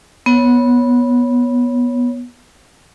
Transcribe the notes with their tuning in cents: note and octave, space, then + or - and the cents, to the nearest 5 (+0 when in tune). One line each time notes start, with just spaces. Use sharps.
B3 -15 C#5 +0